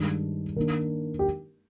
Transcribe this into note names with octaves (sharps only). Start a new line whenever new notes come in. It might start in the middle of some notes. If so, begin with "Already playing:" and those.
Already playing: G2 D#3 G#3 D4
D#3 A#3 D4 A#4
G4